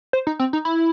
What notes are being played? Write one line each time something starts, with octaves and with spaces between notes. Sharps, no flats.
C5
D#4
C4
D#4
E4